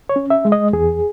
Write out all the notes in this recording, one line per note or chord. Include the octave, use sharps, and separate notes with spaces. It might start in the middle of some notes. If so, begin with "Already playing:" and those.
C#5
C#4
E5
G#3
D#5
E2 G#4